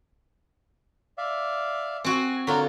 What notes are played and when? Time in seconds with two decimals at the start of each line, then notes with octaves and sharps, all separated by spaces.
1.18 D5 E5 F5
2.04 C4 F#4 G#5
2.47 D3 F4 F#4 A#4 C#5